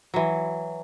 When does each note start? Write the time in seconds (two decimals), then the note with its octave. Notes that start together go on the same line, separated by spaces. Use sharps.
0.14 E3 F#3